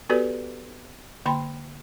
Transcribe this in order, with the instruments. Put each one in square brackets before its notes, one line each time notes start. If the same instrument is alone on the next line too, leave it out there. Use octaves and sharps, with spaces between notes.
[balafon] B3 F#4 G4 A4 B4 D5
D3 A#3 G5 B5 C6